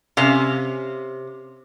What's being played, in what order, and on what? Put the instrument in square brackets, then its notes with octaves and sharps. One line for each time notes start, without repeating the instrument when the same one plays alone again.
[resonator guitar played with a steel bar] C3 [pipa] C#4 F5